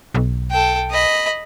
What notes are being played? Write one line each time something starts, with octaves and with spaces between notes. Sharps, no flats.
B1
A4 G5
D#5 B5